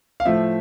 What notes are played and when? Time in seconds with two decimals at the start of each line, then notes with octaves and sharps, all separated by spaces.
0.20 F5
0.25 A2 F3 A3 E5